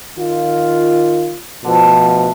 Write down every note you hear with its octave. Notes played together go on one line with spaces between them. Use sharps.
D#3 F4
B2 D3 F3 A3